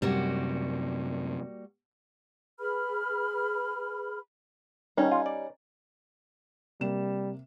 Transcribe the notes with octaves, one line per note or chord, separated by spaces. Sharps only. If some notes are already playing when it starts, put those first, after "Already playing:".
F#2 C3 G3 A#3 F#4
G#4 B4 B5 F6
D#3 G3 C#4 D#4
F4
D5
C3 G3 A#3 E7